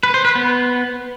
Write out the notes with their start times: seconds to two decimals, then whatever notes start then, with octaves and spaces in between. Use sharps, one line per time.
0.03 B4
0.14 C5
0.25 B4
0.35 B3